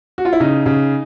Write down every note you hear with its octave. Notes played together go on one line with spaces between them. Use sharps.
F#4
F4
E4
C#3 D#4
C#3